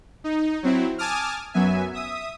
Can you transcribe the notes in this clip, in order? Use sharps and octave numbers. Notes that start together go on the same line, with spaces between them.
D#4
F#3 C4 E4
G#5 A5 D6 D#6 F6
F#2 F#3 B3 E5 G#5
E5 D#6